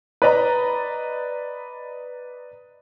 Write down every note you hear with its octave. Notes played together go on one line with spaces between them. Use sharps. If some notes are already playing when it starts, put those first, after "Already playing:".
B4 D5 D#5 A#5 B5